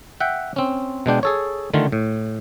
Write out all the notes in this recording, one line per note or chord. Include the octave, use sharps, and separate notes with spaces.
E5 F#5 G5
C4 C#4
B2 G#3 D4 G5
G#4 A4 C#5
D3 D#3 A3 F4
A2